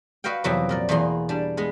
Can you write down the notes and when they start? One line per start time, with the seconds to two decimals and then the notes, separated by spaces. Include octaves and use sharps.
0.24 F#4 B4 D#5 F5 G5
0.44 F2 C3 E3 F#3 B3 C4
0.69 A#2 A#4 D5
0.89 E2 B2 E3 A#3 G#4 C6
1.29 G3 D4
1.57 G#3 B3 G#4